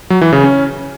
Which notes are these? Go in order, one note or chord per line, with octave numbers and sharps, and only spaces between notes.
F#3
E3
C#3
C#4